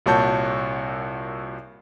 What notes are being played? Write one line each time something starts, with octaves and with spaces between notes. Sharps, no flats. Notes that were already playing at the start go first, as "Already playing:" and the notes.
C2 A#2 F#4 C#5 A5 G6